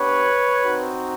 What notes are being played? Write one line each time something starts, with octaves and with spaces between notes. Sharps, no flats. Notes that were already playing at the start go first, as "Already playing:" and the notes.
Already playing: B3 D4 G4 B4 C#5
C4 D#4 F#4